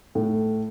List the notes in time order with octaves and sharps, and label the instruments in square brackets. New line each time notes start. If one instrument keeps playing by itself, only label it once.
[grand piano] A2